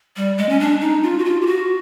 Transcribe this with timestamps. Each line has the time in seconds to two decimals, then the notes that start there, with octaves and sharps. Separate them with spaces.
0.17 G3
0.38 G#3
0.49 C#4
0.60 D4
0.81 D#4
1.03 F4
1.19 F#4
1.25 F4
1.41 G4
1.46 F#4